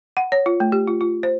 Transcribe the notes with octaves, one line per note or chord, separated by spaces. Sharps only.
F#5
C#5
F4
A3
G4
F4
F4
C5